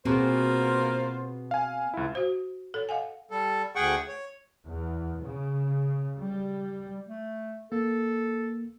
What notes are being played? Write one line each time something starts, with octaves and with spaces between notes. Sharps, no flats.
B2 A#3 C4 F4 G#4 C5
F5 G#5
C#2 E4
F#4 C5
A4 C#5
D#5 F5 F#5 G#5
G3 A4
D2 G#4 F#5 G5 C#6
C#5
E2
C#3
G3
A3
A#3 A4